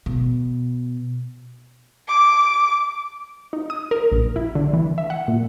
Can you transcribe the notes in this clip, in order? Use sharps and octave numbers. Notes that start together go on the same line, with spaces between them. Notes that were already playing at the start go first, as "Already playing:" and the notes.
B2
D6
D#4
D#6
A#4
A#1
E4
D3
E3
E5
F#5
A#2